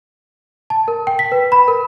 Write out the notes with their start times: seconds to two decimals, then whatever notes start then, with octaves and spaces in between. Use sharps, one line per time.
0.70 A5
0.88 A#4
1.07 G5
1.19 B6
1.32 B4
1.52 B5
1.68 A#4